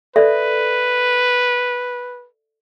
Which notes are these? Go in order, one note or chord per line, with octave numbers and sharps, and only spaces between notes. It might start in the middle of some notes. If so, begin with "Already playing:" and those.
A4 B4 D5 E5